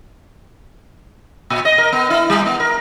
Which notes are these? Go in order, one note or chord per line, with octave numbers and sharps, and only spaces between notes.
A#2
D#5
A#4
B3
E4
G3
B3
A#4